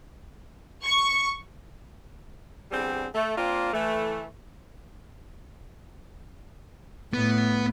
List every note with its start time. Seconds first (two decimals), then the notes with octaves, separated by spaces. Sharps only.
0.84 C#6
2.72 E2 D3 G3 C4 G#4
3.15 A3
3.38 A#3 C4 D4 F4
3.73 E3 A3
7.14 A2 B3